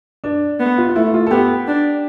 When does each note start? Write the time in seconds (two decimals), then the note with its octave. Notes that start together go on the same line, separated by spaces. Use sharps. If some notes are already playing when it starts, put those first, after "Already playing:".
0.24 D4
0.60 B3
0.78 F4
0.89 F4
0.96 A3 E4
1.14 F4
1.27 A4
1.31 B3 G4
1.68 D4